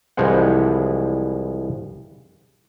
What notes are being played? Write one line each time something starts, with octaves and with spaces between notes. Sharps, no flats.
C2 E3 F3 G#3 C5 F#5